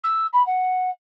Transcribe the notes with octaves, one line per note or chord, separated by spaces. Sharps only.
E6
B5
F#5